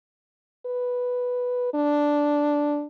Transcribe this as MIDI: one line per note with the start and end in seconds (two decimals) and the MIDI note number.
0.66 1.73 71
1.74 2.86 62